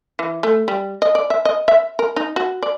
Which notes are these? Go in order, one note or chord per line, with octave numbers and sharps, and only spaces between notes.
E3
A3
G3
D#5
D5
E5
D#5
E5
A#4
D#4
F#4
D5